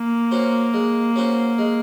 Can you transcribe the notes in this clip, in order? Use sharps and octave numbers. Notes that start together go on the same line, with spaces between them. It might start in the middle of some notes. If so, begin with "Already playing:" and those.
Already playing: A#3
C#4 F#4 C5
G#3
C#4 F#4 C5
G#3